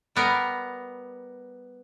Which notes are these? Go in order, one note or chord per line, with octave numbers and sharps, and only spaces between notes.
G3 B3 A#4